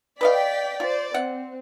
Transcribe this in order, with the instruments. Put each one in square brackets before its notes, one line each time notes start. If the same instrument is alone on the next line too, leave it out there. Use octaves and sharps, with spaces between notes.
[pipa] B4 D#5 F5 [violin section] D5 G5 B6
[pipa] F4 [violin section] C5 D5
[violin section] C4 [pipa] F#5